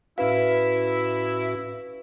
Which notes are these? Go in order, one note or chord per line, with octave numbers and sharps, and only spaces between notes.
A2 C#4 E4 F#4 B4 F5